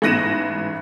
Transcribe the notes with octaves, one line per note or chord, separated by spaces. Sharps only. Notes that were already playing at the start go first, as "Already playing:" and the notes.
A1 G#2 F#6 A#6 D#7 E7